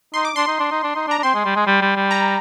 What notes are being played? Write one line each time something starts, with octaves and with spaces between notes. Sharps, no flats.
D#4 C6
D6
D4 C6
D#4
D4
D#4
D4
D#4
D4
A#5
D4
C4 C6
G#3
G3
G#3
G3
G3
G3
A#5